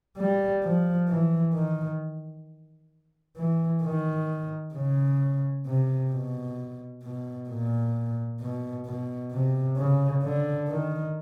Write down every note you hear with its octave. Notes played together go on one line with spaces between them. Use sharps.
G3
F3
E3
D#3
E3
D#3
C#3
C3
B2
B2
A#2
B2
B2
C3
C#3
D3
D#3